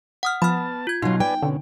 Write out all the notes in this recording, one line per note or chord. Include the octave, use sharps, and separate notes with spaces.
F#5 D#6 F6
F3 B3 A5 B5 F6
F4 G#6
B2 F#3 D#4 F#4 F5 C6
B4 D5 G5 G#5
B2 D3 C#4